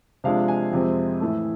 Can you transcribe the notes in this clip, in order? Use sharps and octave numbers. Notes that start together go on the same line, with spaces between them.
C3 F3 G#3 D4 F5
G#5
F2 C3 G#3 C4
A2 E3 A3